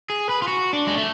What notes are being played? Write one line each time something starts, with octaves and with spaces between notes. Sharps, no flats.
G#4
B4
F4
F#4
D4
G#3
A3